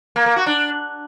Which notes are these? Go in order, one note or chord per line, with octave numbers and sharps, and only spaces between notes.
A#3
A#3
F#4
D4